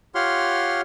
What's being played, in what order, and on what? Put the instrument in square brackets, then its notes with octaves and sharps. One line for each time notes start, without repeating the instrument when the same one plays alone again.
[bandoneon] F4 G4 C#5 F#5 C6 F6